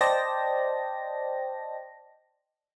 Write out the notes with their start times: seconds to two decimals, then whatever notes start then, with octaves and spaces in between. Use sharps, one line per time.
0.01 C5 D5 D#5 G5 A5 A#6